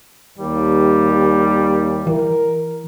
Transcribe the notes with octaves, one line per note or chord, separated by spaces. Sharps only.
D#2 G3
E3 A#4